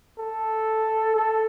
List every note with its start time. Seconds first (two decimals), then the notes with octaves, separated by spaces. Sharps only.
0.19 A4
1.16 A4